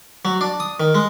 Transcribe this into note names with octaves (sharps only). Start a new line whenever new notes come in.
F#3
D4
D#6
D#3
G#3